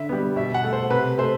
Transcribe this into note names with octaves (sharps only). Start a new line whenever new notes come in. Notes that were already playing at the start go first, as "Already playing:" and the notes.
Already playing: D3 E5
G3 B3
B2 E5
F#5
A3
C5
C3 B4
A3 C5